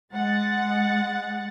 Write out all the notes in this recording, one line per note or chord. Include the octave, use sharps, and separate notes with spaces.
G#3 F#5 A6